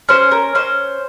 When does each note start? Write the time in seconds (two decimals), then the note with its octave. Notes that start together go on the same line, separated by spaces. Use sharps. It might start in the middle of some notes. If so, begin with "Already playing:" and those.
0.09 C#4 C5
0.31 A#4
0.55 C#4 C5